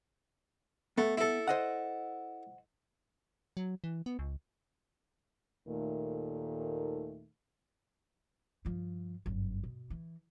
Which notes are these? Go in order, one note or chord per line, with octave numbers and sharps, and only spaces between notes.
A3 B3
E4 A4
C5 D#5 F#5
F#3
E3
B3
C#2
D#2 A#2 D#3 A3
G2 F3
G1 F#2
B2
E3